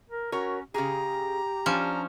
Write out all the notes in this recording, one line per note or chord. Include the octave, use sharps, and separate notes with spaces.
A#4
C#4 F#4 A#4 C#5
C#3 G4 G#4 A#5
F3 C#4 D4